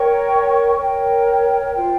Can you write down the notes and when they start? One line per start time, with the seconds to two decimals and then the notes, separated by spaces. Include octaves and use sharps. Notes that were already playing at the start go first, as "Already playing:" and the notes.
Already playing: A#4 C#5 G5 C#6
0.75 A#4 C#5 G5
1.74 F4 C5 G5